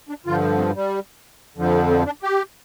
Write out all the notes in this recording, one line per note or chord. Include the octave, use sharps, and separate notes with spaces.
D4
G2 D3 F3 F4
C4
G3
F2 D3 F3
C4
D4
G4